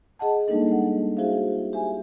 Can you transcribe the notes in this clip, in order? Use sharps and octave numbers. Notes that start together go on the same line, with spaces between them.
G#4 D#5 F#5 A5
G3 G#3 A#3 D4 D#4 A4
G#3 F#5
E4 F#4 G#4 C5 E5 F5
G4 E5 G#5